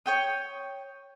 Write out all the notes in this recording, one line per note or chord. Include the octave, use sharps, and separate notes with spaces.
C#5 G5 D#6